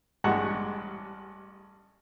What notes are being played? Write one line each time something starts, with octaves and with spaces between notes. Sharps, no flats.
A1 G2 G#3 F#5 A5 C#6